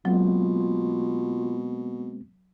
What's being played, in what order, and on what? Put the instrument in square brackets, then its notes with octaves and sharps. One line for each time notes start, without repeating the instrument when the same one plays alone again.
[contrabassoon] B2 [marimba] F#3 [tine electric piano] G#3 A#3 C4 [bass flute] F4